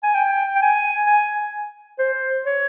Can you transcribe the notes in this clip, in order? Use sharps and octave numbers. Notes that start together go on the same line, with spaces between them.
G#5
G5
G5
G#5
G#5
C5
C#5